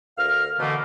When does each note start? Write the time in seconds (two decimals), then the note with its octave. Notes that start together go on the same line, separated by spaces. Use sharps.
0.18 D2 A#4 F5 F6
0.59 B2 D3 E3 A3 A#3